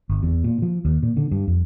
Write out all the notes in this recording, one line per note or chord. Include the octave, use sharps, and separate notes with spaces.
G1
E2
A#2
F3
D#2
A#2
D3
G2
F2